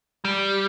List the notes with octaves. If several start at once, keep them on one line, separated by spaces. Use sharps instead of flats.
G3